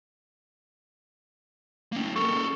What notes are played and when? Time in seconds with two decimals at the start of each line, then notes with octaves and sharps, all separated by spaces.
1.92 A#3 C#4
2.16 A4 A#4 C#6